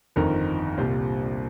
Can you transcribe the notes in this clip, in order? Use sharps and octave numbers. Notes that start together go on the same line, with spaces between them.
G1 F2 D#3 C4 A#4
C2 A#2 G3 C4 C5